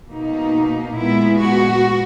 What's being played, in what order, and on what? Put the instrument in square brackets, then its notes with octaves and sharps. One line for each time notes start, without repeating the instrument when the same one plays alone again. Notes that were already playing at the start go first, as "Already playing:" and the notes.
[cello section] B2 A#3 D#4
A#2 G#3 B3 E4
F#4